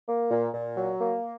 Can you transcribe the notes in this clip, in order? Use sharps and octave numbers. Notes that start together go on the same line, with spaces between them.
A#3
A#2
A#2
F#3
A#3